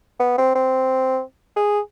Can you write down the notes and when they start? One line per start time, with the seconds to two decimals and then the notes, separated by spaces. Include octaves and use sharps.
0.20 B3
0.38 C4
0.55 C4
1.57 G#4